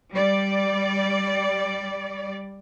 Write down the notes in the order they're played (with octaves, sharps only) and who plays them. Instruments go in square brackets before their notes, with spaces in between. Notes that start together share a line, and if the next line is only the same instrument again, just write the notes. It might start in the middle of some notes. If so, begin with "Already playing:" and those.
[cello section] G3 D5